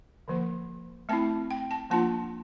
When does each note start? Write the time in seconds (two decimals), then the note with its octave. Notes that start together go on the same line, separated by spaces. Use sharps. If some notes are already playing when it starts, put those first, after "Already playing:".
0.28 D3 F3 A#3
1.09 A3 C4 E4 A5
1.51 G5
1.71 A5
1.90 F3 A#3 D4 F4 A5